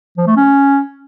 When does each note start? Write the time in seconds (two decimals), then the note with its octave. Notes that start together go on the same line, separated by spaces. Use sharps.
0.17 F3
0.27 A3
0.36 C#4